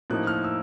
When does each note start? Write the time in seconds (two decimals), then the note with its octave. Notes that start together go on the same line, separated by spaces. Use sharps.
0.10 A2 F3 A#3 D#4 F#6
0.27 F6
0.44 E6